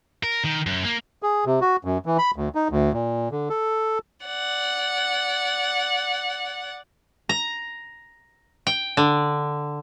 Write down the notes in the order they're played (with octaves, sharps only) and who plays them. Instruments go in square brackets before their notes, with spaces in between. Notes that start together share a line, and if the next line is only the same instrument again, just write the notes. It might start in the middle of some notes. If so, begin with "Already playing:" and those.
[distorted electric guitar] A#4
D#3
F#2
A#3
[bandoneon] G#4
C3
F#4
F#2
E3
B5
D2
D#4
D2
A#2
D3
A4
[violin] D5 F#5
[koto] A#5
G5
D3